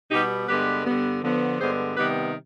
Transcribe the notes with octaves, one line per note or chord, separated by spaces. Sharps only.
B2 G3 B3 D#4 G4
G2 D3 G#3 B3 G4 B4
G2 D3 G3 B3
D3 F3 B3
G2 D3 G#3 B3 G#4 C5
C3 D#3 G3 B3 G4 B4